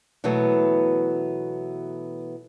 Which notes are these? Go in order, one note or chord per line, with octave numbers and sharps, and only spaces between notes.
B2 E3 F#3 A3 B3